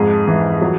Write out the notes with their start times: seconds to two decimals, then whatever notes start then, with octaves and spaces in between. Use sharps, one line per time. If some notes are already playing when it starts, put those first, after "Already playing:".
Already playing: F2 G#2 F3 G#4
0.27 E3
0.62 F#3